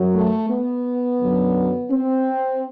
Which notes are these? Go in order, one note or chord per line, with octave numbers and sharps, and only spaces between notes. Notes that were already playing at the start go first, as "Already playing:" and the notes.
Already playing: F#2 F#3
A3
B3
F#2 D3 F#3
C4